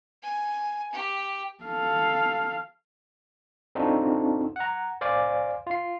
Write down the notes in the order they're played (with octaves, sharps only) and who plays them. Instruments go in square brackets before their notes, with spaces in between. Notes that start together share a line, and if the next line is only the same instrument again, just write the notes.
[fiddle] G#5
G4
[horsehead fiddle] A4 F5
[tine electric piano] C4 D4 D#4 F4 F#4 A4
F#5 A#5
C5 D5 F5 G#5 D6
F4 C7